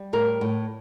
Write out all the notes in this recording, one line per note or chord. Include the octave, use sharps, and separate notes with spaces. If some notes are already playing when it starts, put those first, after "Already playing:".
Already playing: G3
A2 G4 A#4
A2